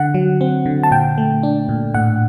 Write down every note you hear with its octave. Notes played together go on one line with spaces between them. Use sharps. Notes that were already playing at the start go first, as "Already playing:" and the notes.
Already playing: D3 F#5
F#3
C4
D3
A5
A#2 G5
A3
D4
A#2
A2 F#5